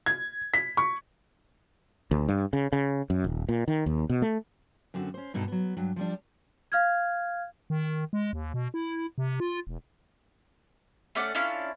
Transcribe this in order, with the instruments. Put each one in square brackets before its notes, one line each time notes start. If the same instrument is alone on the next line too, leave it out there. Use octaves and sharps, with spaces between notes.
[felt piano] G#6
B6
C#6
[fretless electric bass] D2
G2
C#3
C#3
F#2
D#1
A#2
D#3
D#2
B2
A3
[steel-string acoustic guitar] F#2 D3 C4 F#4
C#4 C5
G2 B2 D#4 A4
F#3 B3
G2 F#3
F3 G3 D4
[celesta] F5 F6 G#6
[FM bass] D#3
G#3
D#2
B2
E4
C3
F4
E1
[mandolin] A3 C#4 D5 F#5
C#4 D4 E4 F4